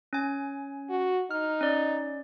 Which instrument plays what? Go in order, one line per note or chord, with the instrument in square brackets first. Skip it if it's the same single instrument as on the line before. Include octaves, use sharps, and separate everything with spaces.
[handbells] C#4 G#5
[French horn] F#4
[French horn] D#4 [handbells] F6
[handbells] C#4 D5